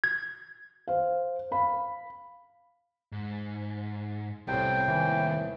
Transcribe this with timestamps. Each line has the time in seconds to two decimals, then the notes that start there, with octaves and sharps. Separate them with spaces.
0.04 G#6
0.88 C5 F5
1.51 F5 B5
3.12 G#2
4.48 C2 A2 B3 C5 G5
4.88 D#2 E3